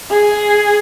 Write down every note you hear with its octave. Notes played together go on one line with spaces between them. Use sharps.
G#4